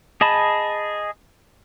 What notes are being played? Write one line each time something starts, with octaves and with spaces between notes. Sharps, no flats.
G#4 D#5 A5 B5